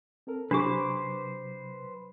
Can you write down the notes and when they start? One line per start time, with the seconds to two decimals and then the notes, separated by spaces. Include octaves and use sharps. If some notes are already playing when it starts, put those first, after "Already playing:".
0.27 C4 A4 A#4
0.51 C3 F#3 D4 G4 B4 C5 D6